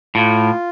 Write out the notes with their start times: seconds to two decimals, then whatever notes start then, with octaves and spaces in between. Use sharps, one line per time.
0.15 A2 F4